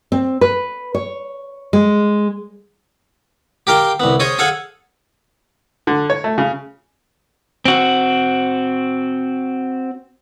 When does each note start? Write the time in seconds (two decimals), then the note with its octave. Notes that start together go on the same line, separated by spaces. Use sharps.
0.12 C4
0.41 B4
0.95 C#5
1.73 G#3
3.67 G4 A#4 F5 G5
4.00 C2 B3
4.20 C#4 G#4 C5 C#5 D#5
4.39 G#4 A4 F5 F#5 G#5
5.87 D3
6.10 C#5
6.24 A3
6.38 C#3
7.65 C4 F#4